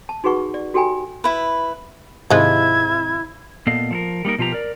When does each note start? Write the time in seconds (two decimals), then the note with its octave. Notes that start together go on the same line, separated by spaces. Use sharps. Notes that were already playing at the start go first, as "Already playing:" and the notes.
0.09 A5
0.24 D#4 F#4 G#4 B4 F#5 C#6
0.54 D5
0.74 F#4 G4 A4 G5 G#5 B5
1.24 E4 B4
2.30 G#2 C3 D#3 F3 G#3 E4 G#6
3.67 A#2 B3 A4 D#5 F5
3.91 F3 A4 A#4
4.25 G3 A#3 D#4 A#4
4.38 B2 F3 F4 G4 A#5
4.52 A#4 D5